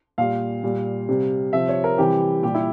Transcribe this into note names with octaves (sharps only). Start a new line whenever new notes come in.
A#2 G3 F5
A#2 G3
C3 G3
C3 F3 E5
C#5
A#4
C3 E3 G3 G4
A#2 G3 G4
E4